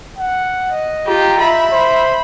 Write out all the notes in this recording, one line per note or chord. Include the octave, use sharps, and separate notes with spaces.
F#5
D#5
F4 G4 A#5
E5 B5
C5